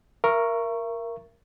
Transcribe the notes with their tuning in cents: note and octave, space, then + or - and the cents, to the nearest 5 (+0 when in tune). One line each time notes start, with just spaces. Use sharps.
A#4 +0 E5 +40 C#6 +0